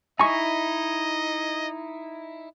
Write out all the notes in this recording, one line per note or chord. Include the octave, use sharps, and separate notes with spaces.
D#4 E4 D#5 G#5 C#6